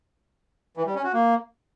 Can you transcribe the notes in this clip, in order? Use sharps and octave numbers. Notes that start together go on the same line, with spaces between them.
E3
G3
C#4
F#4
A#3